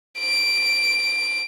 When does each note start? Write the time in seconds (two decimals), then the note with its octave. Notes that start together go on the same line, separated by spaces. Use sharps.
0.20 D7